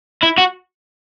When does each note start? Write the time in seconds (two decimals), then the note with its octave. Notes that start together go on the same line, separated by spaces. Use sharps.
0.23 E4
0.38 F#4